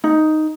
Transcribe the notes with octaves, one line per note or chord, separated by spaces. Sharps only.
D#4